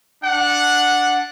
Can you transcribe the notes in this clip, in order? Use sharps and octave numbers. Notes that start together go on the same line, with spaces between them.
D4 F#5